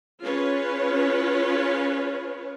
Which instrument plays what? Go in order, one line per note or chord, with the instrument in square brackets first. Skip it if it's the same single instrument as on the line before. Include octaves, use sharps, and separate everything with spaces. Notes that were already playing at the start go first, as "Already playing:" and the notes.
[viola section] C#4 F4 G#4 B4 C#5